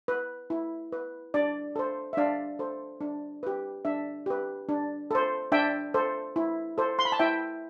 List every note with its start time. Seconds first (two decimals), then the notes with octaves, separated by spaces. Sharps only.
0.08 B4
0.50 E4
0.92 B4
1.34 D4 D5
1.76 A4 C5
2.13 E5
2.17 D4 D5 F5
2.59 A4 C5
3.01 D4
3.43 G4 B4
3.85 D4 E5
4.26 G4 B4
4.69 D4
5.11 A4 C5
5.52 D4 E5 G5
5.94 A4 C5
6.36 E4
6.78 A4 C5
6.99 C6
7.05 B5
7.12 A5
7.19 E4 E5 G5